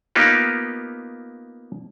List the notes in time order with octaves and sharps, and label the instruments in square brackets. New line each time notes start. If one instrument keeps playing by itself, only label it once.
[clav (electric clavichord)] A#3 B3 D#4 F4 G4